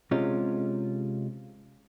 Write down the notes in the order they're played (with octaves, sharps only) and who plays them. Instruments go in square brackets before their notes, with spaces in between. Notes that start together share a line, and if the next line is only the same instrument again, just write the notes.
[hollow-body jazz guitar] C3 G#3 C#4 F4